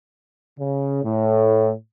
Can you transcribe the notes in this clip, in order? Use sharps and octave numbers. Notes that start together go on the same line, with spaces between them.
C#3
A2